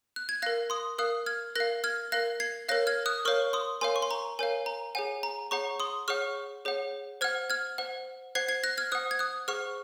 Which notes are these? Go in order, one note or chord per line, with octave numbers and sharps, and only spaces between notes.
F#6
G#6
A#4 F5 F#6 A#6
C6 D#6
A#4 F5 D#6 F#6
F6 G#6
A#4 F5 F#6 A#6
F6 G#6
A#4 F5 F#6 A#6
G#6 C7
A#4 C#5 F5 F#6 A#6
F6 G#6
D#6 F#6
A#4 C#5 F5 C#6 F6
C6 D#6
A#4 C#5 F5 G#5 C6
C#6
C6
A#5
A#4 C#5 F5 G#5
A#5
G#4 C#5 F#5 G#5
A#5
G#4 C#5 F#5 A#5 C#6
C6 D#6
G#4 C#5 F#5 C#6 F6
G#4 C#5 F#5
C5 F#5 F6 G#6
F6 G#6
C5 F#5
C5 F#5 G#6 C7
G#6 C7
F#6 A#6
F6 G#6
C5 F#5 D#6 F#6
G#6
D#6 F#6
G#4 C5 F#5 C#6 F6